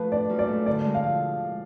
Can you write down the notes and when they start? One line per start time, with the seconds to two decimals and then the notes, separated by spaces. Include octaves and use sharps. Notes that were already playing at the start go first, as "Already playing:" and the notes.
Already playing: F3 A3 B4
0.11 D4 D5
0.30 F#2
0.39 D5
0.48 A3
0.66 D3 D5
0.85 G#3
0.95 F5
1.04 F3